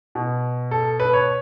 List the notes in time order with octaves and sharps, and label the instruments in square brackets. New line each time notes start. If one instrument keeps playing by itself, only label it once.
[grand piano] B2
A4
B4
C#5